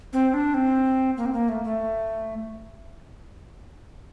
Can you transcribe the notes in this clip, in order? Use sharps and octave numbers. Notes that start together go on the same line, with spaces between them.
C4
D4
C4
A#3
C4
A#3
A3
A3